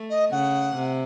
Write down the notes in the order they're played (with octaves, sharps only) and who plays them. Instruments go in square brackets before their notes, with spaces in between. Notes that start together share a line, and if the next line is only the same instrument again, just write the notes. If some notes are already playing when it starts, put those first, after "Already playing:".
Already playing: [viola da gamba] A3
[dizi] D#5
[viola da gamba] C#3 [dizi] F#5
[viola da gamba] C3